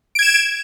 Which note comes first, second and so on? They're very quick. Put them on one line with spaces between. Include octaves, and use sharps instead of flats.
D7 G#6 E7